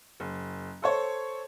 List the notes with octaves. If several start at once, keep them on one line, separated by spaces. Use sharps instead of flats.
F#1
A4 C5 C#5